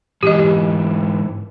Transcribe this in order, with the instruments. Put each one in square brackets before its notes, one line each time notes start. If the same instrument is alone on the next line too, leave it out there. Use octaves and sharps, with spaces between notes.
[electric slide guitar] G#2 E3 G#3 [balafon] G4 D#5